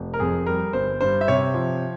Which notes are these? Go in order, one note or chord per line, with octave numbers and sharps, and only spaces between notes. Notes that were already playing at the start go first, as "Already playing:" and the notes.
Already playing: F1
A#4
F2 G#4
G3 A#4
G1 C5
G2 C5
E5
C3 C#5
F3